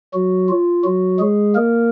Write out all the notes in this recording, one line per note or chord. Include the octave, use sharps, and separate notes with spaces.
F#3 F#4
F4
F#3 F#4
G#3 G#4
A#3 A#4